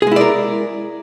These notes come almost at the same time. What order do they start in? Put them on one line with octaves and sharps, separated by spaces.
G#4 G#3 E4 D5 A#4